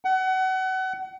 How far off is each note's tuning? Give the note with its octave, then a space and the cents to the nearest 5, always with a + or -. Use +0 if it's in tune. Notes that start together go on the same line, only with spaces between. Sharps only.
F#5 +30